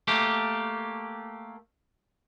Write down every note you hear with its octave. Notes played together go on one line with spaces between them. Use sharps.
A3 A#3 G4